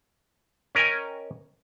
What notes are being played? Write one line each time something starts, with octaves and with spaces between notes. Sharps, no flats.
C#4 A#4 D#5 G5 G#5